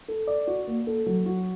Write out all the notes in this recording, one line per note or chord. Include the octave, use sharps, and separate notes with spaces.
A4
D5
F#4
A#3
A4
F#3
F#4